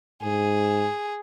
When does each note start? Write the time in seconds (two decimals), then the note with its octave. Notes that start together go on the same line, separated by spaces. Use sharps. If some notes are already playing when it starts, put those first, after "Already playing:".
0.22 G#2 G#4